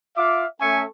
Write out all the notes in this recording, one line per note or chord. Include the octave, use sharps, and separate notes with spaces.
F4 E5 F5 D6
A3 C#4 A4 E5 G#5 C#6